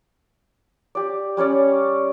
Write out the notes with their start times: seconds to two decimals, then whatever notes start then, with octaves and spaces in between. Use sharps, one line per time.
0.95 G4 D5
1.37 G3 C#4 C#5 D5